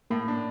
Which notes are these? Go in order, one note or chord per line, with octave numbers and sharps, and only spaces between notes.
A2 A#3
D4